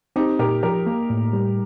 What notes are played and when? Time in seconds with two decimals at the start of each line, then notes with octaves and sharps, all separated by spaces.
0.16 C4 D#4 G4
0.39 A#2 G4 A#4
0.63 F3 G4 A#4
0.87 A#3
1.10 A2
1.33 G3